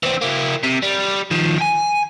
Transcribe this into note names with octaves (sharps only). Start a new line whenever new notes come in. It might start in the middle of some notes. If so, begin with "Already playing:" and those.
E3 C4
A#3 E4
C3
G3
D#3 F3
G5 G#5